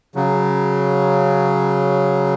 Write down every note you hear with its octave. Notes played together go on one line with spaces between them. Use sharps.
C#3 F#3